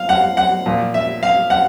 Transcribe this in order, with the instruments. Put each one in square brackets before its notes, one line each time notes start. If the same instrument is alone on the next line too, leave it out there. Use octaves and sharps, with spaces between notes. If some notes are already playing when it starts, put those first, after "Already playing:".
Already playing: [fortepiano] F5
F#5
F#5
A#2 F3
E5
F5
F#5